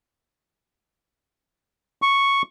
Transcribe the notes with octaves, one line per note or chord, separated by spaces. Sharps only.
C#6